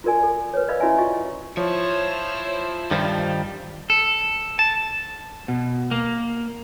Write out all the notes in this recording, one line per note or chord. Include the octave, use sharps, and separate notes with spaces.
F4 F#4 A#4 D5 G#5
A4
B4 C#5
D5 D#5 F5 B5 E6
C#4 E4 F#4 C#5 E5 G#5
F4 F#4 D#5 G5 C#6
F3 E4 C5 C#5
G2 D#3 F3 G3
A4
A5
B2
A#3